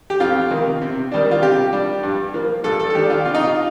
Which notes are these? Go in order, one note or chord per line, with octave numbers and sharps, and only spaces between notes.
G4
F2 F4
C3 D#3
C3
D#3 G3 D4
F4
C3 G4
G3 D4
G2
F3 A#3
G2 A4
A4
A4
D#3 A#3 D4 G4
F4
C3 F4
D#4
F4